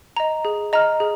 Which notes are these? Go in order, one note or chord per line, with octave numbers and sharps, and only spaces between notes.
D#5 A#5
G#4
D#5 A#5 F6
G#4